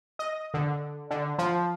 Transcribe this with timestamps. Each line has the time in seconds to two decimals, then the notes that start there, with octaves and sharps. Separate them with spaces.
0.19 D#5
0.54 D3
1.11 D3
1.39 F3